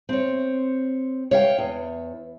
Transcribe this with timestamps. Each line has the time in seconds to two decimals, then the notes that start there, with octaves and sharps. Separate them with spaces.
0.09 C4 C#5
1.31 C#5 F5 G5
1.58 E2